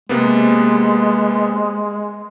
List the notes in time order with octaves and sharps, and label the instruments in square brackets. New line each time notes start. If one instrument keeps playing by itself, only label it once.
[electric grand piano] C3 A#3 B3 [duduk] G#3